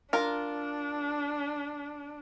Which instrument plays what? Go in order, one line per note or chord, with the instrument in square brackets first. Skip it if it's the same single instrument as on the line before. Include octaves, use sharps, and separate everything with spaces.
[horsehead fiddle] D4 [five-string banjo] F4 A#4